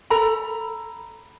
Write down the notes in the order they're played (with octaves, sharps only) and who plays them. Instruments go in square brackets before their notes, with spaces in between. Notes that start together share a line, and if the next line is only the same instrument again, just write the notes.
[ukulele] A4 A#5 B5